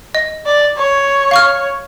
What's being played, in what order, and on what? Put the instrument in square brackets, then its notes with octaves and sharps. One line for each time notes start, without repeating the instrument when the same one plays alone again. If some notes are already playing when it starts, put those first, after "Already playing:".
[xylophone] D#5
[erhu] D5
C#5
[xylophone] F5 C#6 F6